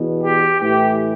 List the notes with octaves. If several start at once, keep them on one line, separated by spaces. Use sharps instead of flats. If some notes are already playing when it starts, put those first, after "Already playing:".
Already playing: E2 B2
G4
A2 E3 G4